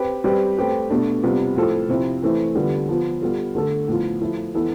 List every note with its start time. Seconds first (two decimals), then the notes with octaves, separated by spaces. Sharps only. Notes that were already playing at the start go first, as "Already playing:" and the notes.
Already playing: C4 G4 B4
0.24 G3 C4 G4 B4
0.57 A3 C4 G4 B4
0.90 B2 A3 D4
1.23 C3 G3 B3 F4
1.56 A2 F3 C4 F4 A4
1.89 C3 F3 C4 E4
2.23 E3 A3 C4 E4
2.55 D3 G3 B3 F4 B4
2.89 F3 B3 F4
3.22 G3 B3 F4 A4
3.55 D3 A3 D4 A4
3.88 A2 F3 B3 F4
4.21 F3 A3 E4
4.54 E3 B3 E4 A4